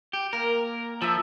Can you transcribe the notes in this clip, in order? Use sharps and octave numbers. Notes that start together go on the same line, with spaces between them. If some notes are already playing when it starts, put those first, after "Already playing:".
G4
A#3 A#4
F3 A4 E5